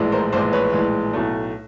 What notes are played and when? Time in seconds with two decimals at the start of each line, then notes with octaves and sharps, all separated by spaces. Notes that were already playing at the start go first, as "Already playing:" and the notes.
Already playing: A#1 A2 E3 G#3
0.12 A#4 C5
0.32 A#1 A2 E3 G#3 C5 D5
0.53 B4 C#5
0.72 A#1 A2 E3 G#3
1.13 B1 A2 F#3 A3